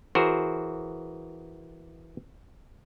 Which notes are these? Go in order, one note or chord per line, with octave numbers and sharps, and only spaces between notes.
E3 F#4 G#4 A#4 C5